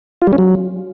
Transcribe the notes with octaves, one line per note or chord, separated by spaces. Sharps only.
F4
G3
C#4
F#3